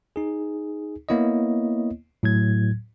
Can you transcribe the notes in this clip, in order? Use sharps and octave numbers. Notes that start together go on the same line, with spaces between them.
D#4 G#4
A#3 B3 E4 C#5 D#5
A2 F#3 G#6